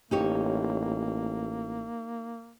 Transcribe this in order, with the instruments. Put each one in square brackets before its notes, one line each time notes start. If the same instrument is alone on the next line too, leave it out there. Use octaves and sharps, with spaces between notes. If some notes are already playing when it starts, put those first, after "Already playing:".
[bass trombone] A1 [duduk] A#3 [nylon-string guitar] D#4 G4 C#5